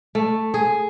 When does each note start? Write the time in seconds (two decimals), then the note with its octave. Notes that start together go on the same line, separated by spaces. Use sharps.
0.15 A3
0.54 G#4